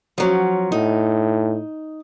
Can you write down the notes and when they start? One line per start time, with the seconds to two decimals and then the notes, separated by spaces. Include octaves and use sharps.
0.18 F3 F#3 C#4
0.72 A2 D#4